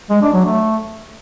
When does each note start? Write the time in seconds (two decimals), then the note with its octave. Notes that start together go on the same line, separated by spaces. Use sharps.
0.10 G#3
0.22 D4
0.34 F#3
0.45 A3